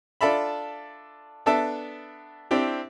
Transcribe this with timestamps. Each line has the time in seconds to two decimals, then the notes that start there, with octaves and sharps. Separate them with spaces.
0.21 D4 F4 A4 D5 E5 B5
1.46 B3 D4 A4 E5 A5
2.51 C4 D4 E4 G4